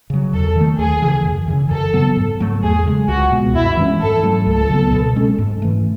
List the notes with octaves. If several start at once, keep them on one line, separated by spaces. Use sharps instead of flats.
C#3 F#3
E2 A4
D#3
A3
D#2 G#4
C#3 E3
F#2
C#3 E3
F#2 A4
C#3 F#3 B3
G#2
F#3 A3
E2 G#4
C#3 G#3
C#2 F#4
B2 G#3 B3
F#2 E4
E3 G#3 C#4
G#2 A4
F#3 A3
C#2 A4
C#3 F#3 B3
B2
G#3 C#4
G#2
E3 A3